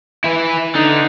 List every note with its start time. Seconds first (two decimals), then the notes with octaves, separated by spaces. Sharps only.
0.24 E4 B4
0.75 D3 D#4